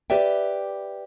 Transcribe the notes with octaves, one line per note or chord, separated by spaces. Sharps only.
G4 B4 D5 E5 G5